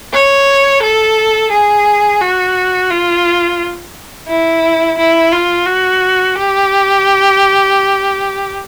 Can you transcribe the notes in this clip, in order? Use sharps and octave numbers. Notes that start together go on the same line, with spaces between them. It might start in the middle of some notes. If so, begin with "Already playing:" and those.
C#5
A4
G#4
F#4
F4
E4
E4
F4
F#4
G4